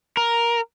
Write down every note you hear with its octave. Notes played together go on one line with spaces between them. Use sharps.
A#4